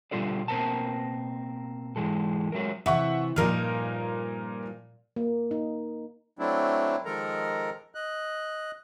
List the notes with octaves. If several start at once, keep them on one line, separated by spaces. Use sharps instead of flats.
B2 D3 G3 F4 A4 D5
B2 A#3 C4 A#4 A5
G#2 E3 G#3 A4
F#3 G#3 A3 A#4
C3 E3 E5 F#5 C#6
G2 A#2 F3 D#4 A#4 F6
A#3
D#4
F#3 A3 C4 D4 E4
D#3 F3 G#3 A4 A#4 A#5
D#5 F#6